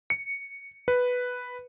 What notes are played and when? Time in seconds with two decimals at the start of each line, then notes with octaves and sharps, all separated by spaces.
0.10 C#7
0.88 B4